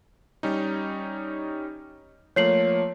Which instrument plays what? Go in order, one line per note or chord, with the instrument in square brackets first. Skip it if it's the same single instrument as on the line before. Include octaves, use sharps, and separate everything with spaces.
[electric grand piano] G3 C#4 D#4
[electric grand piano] F3 A3 A#3 [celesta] C#5 C7 F#7